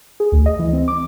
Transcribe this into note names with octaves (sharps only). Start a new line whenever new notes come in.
G#4
D2
D#5
E3
C4
D6